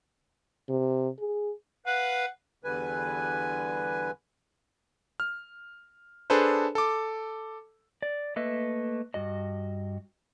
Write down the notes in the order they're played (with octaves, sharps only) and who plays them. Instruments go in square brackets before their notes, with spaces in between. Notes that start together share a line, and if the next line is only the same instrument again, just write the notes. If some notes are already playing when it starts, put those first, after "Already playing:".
[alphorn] C3
G#4
[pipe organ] B4 F5 [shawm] F#5
[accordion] E2 D3 G3 B4 G#5
[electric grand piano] F6
D4 G#4 A4 B4 C5
A4 D6
[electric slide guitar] D5
A3 A#3 B4 D#5 E5
G2 F#4 D#5